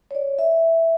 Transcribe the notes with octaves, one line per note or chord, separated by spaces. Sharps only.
C#5
D5
E5